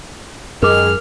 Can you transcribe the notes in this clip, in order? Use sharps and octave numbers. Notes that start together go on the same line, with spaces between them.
F#2 D#3 G#3 G#4 A#4 D6 F6